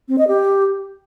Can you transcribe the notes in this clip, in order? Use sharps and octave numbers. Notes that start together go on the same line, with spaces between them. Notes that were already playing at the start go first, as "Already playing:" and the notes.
C4
D#5
G4